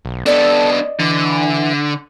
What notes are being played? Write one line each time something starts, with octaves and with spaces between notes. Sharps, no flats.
B1
B3 D4 A4 D5 D#5
D3 E3